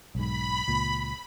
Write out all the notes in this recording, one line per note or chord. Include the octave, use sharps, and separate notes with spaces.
B1 G#2 B5
C#2 A#2